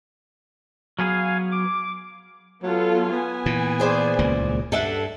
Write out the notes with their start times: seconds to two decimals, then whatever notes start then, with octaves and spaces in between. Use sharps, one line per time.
0.99 F#3 B3 G#4 F5 G#5
1.51 D6
2.63 F#3 B3 F4 A4
3.12 B3 G#5
3.46 A#2 E3
3.80 G#4 C5 D5
4.19 D#1 C#2 A#3
4.72 G2 A4 E5 F#5